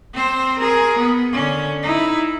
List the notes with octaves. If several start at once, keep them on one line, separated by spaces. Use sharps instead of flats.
C4 C5
G#4 A#4
B3
D3 C#4
D#4 E4